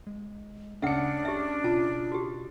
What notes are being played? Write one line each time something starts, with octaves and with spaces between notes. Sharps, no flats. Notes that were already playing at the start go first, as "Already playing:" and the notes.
G#3
D2 C#3 D4 E5 F#5 C#7
G4 E5
B2 F4 A5
F#4 G4